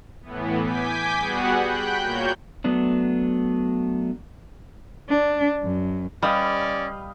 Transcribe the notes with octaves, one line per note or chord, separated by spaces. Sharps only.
A2 E3 B3
G#5 D6 G6 B6
G3 B3 F#4 G#4 F#5
G5 B5 F#6 G6
A#2 A#3 F#4 C#5 G6
F#3 A3 B3 D4
D4
F#2
G3 C#4 B4 D5 D#5 F5